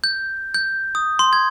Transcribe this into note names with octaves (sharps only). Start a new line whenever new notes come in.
G6
G6
D#6
C6
G#6